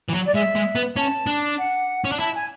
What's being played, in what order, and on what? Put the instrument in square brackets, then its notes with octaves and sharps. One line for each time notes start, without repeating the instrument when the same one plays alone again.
[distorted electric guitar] E3
F#3
[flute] D5
[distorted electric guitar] G#3 [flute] E5
[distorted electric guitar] G#3
B3
[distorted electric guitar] C#4 [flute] A5
[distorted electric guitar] D4
[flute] F#5
[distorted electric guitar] C#4
D4
[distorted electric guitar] E4 [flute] A5
[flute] G#5